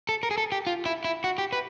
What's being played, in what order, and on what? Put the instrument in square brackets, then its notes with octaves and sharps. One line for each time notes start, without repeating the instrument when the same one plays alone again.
[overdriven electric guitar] A4
A#4
G#4
A4
G4
F4
E4
E4
F#4
G4
B4